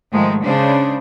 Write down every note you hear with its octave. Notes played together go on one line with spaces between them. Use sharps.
G#2 D#3 F3 G#3 A3
C#3 G#3 D4 C5